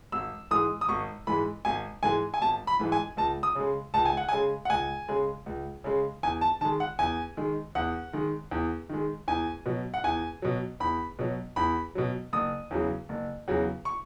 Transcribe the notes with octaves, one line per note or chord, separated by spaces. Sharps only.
G#1 E6
G#2 E3 G#3 D#6
D#6
G#1 C#6
G#2 E3 G#3 B5
G#1 G#5
G#2 E3 G#3 G#5
G#5
G#1 A5
B5
G#2 E3 G#3
G#5
C#2 A5
D#6
C#3 G#3
C#2 A5
G#5
F#5
C#3 G#3 G#5
F#5
C#2 G#5
C#3 G#3
C#2
C#3 G#3
E2 G#5
A5
D#3 G#3 A5
F#5
E2 G#5
D#3 G#3
E2 F#5
D#3 G#3
E2
D#3 G#3
E2 G#5
B2 F#3
F#5
E2 G#5
B2 F#3
E2 B5
B2 F#3
E2 B5
B2 F#3
F#1 D#6
E2 C#3 F#3
F#1
E2 C#3 F#3
C#6